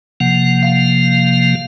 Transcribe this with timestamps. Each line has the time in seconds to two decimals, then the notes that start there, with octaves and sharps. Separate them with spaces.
0.20 C3 F3 A#3 F#5
0.63 F5